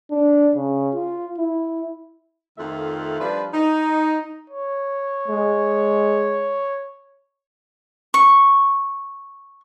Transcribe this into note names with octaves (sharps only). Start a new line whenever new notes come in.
D4
C#3
F4
E4
F2 D#3 A3 F4 E5 F5
F3 G3 D4 B4
D#4
C#5
G#3
C#6